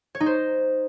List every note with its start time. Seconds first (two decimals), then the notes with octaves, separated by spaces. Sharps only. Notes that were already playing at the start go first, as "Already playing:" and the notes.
0.15 C#5
0.20 D#4
0.26 C5